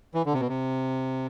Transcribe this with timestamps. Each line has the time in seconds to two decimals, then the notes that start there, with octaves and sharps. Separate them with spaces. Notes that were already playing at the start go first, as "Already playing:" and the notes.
0.15 E3
0.26 D3
0.34 C3
0.40 B2
0.49 C3